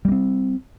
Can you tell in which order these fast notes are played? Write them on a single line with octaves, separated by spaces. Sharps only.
G3 A#3 C4